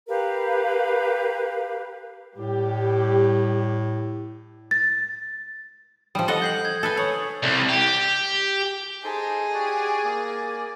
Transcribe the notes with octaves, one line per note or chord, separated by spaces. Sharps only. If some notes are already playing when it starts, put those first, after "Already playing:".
G4 A#4 B4 F5
A2 G3 G4
A6
F3 G3 D#6
A4 D#5 F#5 F#7
G6 C7 F#7
G#6
A4 B4 G#5
C#5 D#6 F#7
C2
G4
D#4 G#4 A4 C5
F#4 G4 D5
A#3 D5